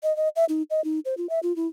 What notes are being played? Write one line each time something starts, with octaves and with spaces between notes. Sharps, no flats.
D#5
D#5
E5
D#4
D#5
D#4
C5
F4
E5
F4
E4